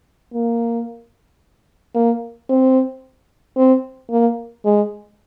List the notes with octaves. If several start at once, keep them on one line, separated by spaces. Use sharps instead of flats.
A#3
A#3
C4
C4
A#3
G#3